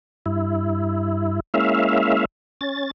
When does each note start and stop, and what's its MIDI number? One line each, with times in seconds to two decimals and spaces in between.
0.26 1.40 43
0.26 1.40 64
1.54 2.25 56
1.54 2.25 58
1.54 2.25 61
1.54 2.25 64
1.54 2.25 76
1.54 2.25 77
2.61 2.91 61
2.61 2.91 93